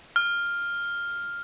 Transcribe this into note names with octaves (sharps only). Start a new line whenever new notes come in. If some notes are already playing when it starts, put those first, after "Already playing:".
F6